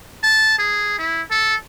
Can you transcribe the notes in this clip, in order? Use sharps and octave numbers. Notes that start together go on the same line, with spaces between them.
A5
G#4
E4
A4